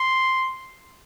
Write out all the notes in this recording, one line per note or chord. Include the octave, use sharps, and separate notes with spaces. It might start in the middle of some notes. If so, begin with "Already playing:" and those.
Already playing: C6